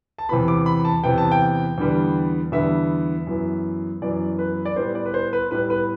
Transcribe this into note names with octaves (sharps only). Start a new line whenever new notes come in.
A5
E2 C3 E3 B3 B5
D6
B5
A5
E2 C3 E3 B3 G5
A5
G5
E2 D3 G3 B3
E2 D3 G3 B3 E5
F#2 E3 B3
F#2 E3 B3 D5
B4
D5
A2 G3 B3 C5
D5
B4
C5
B4
A2 G3 B3 B4
B4